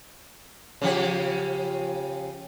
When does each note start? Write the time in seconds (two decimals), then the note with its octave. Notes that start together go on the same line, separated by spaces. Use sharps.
0.82 C#3 F3 G4